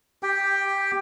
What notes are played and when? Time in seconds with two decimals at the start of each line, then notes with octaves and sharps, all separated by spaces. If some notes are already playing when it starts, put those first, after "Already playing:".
0.23 G4 G5